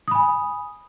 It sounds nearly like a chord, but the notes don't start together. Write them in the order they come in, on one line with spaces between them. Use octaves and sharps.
D#6 B5 G#5